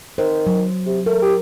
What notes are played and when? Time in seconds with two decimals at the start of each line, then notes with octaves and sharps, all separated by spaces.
0.18 D#3 C5
0.47 F#3
0.86 C3
1.06 A3 A#4
1.22 G4